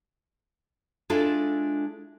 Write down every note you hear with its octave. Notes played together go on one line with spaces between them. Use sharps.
G#3 D4 E4 F4 A4